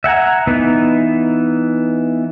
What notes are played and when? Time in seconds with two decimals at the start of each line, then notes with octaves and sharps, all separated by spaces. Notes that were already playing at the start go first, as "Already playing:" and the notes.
0.04 E5 F#5 G#5 A#5
0.47 E3 B3 D#4